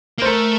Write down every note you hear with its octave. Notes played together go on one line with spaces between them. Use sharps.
A#3
C5
A3 A#4